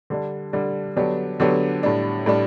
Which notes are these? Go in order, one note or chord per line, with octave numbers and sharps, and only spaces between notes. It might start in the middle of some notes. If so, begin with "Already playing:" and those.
D3 G3 D4
D3 G3 D4
D3 F#3 B3 D4 G4
D3 F#3 B3 D4 G4
A2 G3 D4
A2 G3 D4